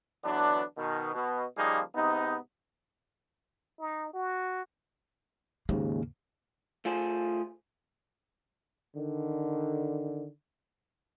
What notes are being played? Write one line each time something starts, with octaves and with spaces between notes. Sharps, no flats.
D3 E3 F#3 B3 D4
B2 D#3
B2
C#3 F3 G3 A#3 D#4 G#4
G#2 C3 B3 D#4
D#4
F#4
D#2 G#2 C#3 A#3
A3 F4 G#4 C5
D3 D#3